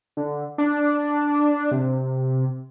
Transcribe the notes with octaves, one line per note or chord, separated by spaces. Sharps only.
D3
D4
C3